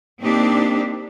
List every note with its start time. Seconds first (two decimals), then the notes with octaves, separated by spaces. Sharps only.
0.22 A#3 C4 D4 D#4 G4